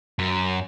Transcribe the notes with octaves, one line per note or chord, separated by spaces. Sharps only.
F#2